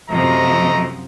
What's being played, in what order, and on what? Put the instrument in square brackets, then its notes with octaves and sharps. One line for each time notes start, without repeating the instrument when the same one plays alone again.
[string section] F#2 C3 F3 [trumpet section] A3 D#5 A#5